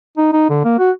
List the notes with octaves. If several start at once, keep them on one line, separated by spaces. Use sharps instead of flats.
D#4
D#4
D3
A#3
F#4